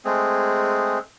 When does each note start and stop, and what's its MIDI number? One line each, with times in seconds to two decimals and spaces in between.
0.05 0.99 56
0.05 0.99 57
0.05 0.99 60
0.05 0.99 68